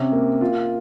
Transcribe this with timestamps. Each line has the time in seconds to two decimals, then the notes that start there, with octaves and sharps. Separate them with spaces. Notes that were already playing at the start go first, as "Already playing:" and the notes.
Already playing: C3 C#4
0.12 A#3
0.41 F4